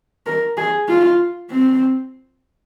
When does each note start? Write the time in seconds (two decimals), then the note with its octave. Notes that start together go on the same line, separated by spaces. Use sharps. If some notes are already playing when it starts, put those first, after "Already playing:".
0.26 A#4
0.57 G#4
0.88 F4
1.50 C4